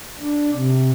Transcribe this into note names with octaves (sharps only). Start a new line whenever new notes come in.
D4
C3